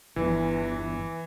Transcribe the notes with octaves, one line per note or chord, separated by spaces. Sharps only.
G1 E2 E3